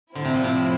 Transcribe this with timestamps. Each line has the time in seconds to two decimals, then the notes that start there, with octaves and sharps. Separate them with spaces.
0.15 A2 D3 F3 C4 E4
0.25 C3
0.34 A#2
0.44 C3